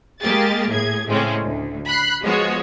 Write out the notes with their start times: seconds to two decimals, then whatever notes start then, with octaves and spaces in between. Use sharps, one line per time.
0.21 G#3 A#3 G4 G#4 A6
0.68 A2 G#4 G#6
1.07 A2 C#3 G#3 A3 C4 C#4
1.43 D2
1.87 B5 F#6 C7
2.22 F3 G#3 B3 F#4 C#5